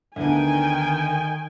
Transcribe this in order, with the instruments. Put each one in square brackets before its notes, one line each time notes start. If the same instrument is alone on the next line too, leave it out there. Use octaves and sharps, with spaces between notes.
[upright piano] D2 B3 D4 [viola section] D#3 G5 G#5